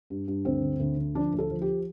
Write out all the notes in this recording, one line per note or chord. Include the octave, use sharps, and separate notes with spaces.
G2
G2
D2 C4
D3
D2
D3
F3 D4
D2
A4
F3
G4